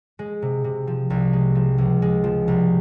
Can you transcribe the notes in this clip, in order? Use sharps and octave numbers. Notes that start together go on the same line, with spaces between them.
G#3
C3
C3
F3
C2
G#3
F3
C#2
G#3
F3
C2